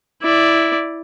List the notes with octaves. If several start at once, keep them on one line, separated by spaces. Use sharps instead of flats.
E4 D5